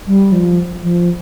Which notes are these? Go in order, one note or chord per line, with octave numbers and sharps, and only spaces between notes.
G3
F3
F3